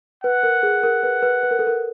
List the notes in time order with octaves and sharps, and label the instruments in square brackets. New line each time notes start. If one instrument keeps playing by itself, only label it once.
[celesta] B4 [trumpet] F#5
[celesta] A#4
G#4
A#4
B4
B4
B4
A#4
A4
A#4